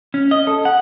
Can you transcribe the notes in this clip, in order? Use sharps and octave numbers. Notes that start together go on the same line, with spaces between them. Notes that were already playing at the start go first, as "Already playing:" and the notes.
C#4
D#5
A4
F#5